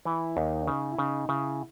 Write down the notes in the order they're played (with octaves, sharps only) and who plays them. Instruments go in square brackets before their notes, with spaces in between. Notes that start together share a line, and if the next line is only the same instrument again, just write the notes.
[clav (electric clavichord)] E3 [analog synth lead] E4
[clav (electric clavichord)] D#2 [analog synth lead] D#4
[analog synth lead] D4
[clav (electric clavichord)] C#3 [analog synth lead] D#4
[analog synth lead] E4
[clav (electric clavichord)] C#3 [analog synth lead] D#4
[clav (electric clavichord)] C#3 [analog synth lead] E4